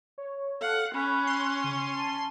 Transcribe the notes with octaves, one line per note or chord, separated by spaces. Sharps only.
C#5
A4 F5 F#5
C#4 B5 F#6
C6
C#3 D#7
A5